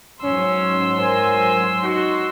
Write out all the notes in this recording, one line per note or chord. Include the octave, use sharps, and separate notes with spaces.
G#2 F#3 C#4 C6 E6
A#4 C5 G#5
D#4 F#4